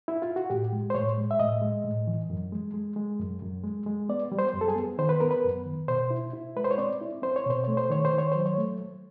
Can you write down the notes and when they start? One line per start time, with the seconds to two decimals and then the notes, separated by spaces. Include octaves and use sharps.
0.08 E4
0.22 F4
0.36 F#4
0.50 A2 G4
0.73 G#3
0.90 C5
0.95 A2 C#5
1.18 G#3
1.31 E5
1.40 A2 D#5
1.62 G#3
1.84 A2
2.07 E3
2.30 F#2
2.53 G#3
2.74 G#3
2.96 G#3
3.19 F#2
3.42 F#2
3.64 G#3
3.86 G#3
4.09 B3 D5
4.32 G3
4.39 C5
4.54 F#2
4.61 A4
4.68 G#4
4.76 B3
4.98 D#3 C5
5.09 B4
5.20 B3 A#4
5.31 B4
5.44 F#2
5.65 D#3
5.88 B2 C5
6.10 E4
6.33 E4
6.56 G#3 B4
6.64 C5
6.71 C#5
6.78 C4 D5
7.01 E4
7.22 C4 C5
7.36 C#5
7.46 B2 C5
7.64 A3 C#5
7.77 C5
7.90 D#3 C#5
8.05 C5
8.13 D#3
8.18 C#5
8.32 F#3 C5
8.46 C#5
8.58 A3